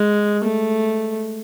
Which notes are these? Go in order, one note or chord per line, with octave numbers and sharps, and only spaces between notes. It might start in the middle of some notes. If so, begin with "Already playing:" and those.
Already playing: G#3
A3